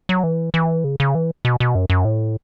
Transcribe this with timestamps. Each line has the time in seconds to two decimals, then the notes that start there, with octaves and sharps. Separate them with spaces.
0.09 F#3
0.23 E3
0.54 E3
0.84 C#3
1.00 C#3
1.15 E3
1.45 B2
1.60 B2
1.75 F#2
1.90 F#2
2.05 A2